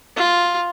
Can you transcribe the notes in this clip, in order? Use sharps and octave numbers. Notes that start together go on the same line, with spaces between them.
F4